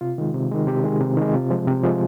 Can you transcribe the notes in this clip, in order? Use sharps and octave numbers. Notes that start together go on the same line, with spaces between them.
C3 F4
D#3 G#3
C3
D#3 G#3
C3 G4
D#3 G#3
C3
D#3 G#3
C3 F4
F3 G#3
C3
F3 G#3